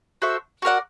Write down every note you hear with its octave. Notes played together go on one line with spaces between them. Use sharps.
F#4 A4 C5 E5
F#4 A#4 D5 F#5